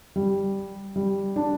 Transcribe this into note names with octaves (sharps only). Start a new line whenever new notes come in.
G3
G3
D4